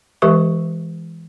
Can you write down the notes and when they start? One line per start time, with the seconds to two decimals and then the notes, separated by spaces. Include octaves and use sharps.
0.22 E3 G#3 G4 A#4 E5 C#6